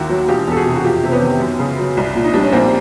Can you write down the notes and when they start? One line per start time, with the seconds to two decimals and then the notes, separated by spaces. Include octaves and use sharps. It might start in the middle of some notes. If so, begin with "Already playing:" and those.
Already playing: D#2 D#3 E4 F#4
0.09 F#3
0.28 E1 F4 G4
0.47 E2 A4
0.56 F#4 G#4
0.66 C3
0.75 F#4
0.84 F2 F4 G4
1.03 C3 C4
1.12 B3 C#4
1.22 D#3
1.40 F#2
1.59 C#3
1.78 F#3
1.97 C2
2.15 A#2
2.24 D#4
2.34 G3 D4
2.43 C#4
2.52 A#1 A#3 C4